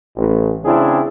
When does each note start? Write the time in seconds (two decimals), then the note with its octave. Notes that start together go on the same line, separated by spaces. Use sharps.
0.16 A1
0.63 C#3 C4 D4 E4 G#4